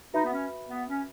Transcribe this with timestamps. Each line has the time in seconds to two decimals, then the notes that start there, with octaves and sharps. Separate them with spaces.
0.13 D#4 F#4 B4 E5 B5
0.25 B3
0.33 C#4
0.69 B3
0.88 C#4